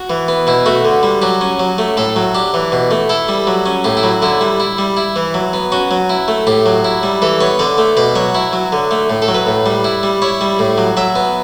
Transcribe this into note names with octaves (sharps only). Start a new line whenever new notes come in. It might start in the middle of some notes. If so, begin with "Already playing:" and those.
Already playing: F#4
E3
B3
B2 E4
A3 F#4
D3
G3
F#3 G4
C#4
F#3
A3
A2 A4
F#3
D4 G4
E3
B2
A3
E4 A4
G3
F#3
C#4
A2 G4
E4
F#3
D3 E4
G3
E4
G3
E4
E3
F#3
B3
C#4 F#4
F#3
E4
A3
A2 G4
F#3
E4
G3
E3 A4
B3 C#5
D3 D5
A3
B2 D5
F#3 C#5
E4
F#3
D3
A3
A2
A4
F#3
B4
A2
G3
E4
G3
E4 C#5
G3
A2
F#3
F#3 E5
B3